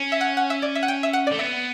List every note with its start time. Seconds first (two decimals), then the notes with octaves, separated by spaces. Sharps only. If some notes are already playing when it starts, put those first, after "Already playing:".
Already playing: C#4
0.12 E5
0.21 F#5
0.37 F#5
0.50 E5
0.62 D5
0.75 E5
0.83 F#5
0.88 G5
1.03 E5
1.13 F#5
1.27 A3 D5
1.39 B3 E5